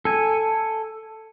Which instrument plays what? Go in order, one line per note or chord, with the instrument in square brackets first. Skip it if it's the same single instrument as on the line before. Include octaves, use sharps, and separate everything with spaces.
[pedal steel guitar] A4 G#5